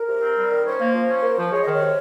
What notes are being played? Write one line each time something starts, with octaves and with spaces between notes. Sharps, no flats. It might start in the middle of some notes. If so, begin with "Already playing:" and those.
Already playing: A#4
C3
C4
G3
D#3
C#4 C5
A#3
F3
C#4
A#3
F3
G#3 C#5
D#3 D#5
C#5
C3